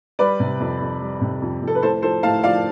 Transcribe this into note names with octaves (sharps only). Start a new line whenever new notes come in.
G3 B4 D5
C3
F2
F2
G3
C3
F2
F2
A4
B4
A2 A4 C5
F3 A4 C5
A2 F5 A5
F3 D5 F5